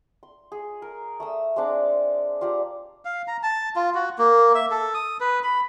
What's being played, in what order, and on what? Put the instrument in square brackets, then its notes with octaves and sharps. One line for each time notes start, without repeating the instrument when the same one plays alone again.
[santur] C6
G#4
A#4
A3 D#6 E6
G#3 C4 D4 D6
F4 G4 D5 A#5
[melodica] F5
A#5
A5
F4
F#4
A#3
E5
A4
D#6
B4
B5